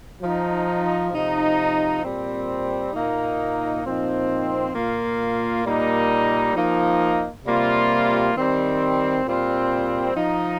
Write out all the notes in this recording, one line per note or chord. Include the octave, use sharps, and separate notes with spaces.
F3 D#4
C3 F3 D#4
A#2 G3 C4
A#2 A#3 D#4
A#2 F3 C4 D#4
A#2 A#3 F4
A#2 G3 A#3 D#4
F3 A#3 D#4
C3 G3 A#3 F4
D#3 G3 C4
A#2 G3 C4 F4
F3 D#4